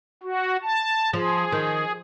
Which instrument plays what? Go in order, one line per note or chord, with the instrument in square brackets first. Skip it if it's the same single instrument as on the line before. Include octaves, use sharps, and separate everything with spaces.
[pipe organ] F#4
A5
[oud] F3 [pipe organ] G#4
[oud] D#3